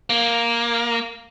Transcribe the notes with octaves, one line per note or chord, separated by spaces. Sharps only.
A#3